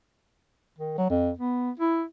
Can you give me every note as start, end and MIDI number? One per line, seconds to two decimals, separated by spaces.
0.78 0.93 51
0.98 1.07 54
1.10 1.31 41
1.38 1.71 59
1.79 2.04 64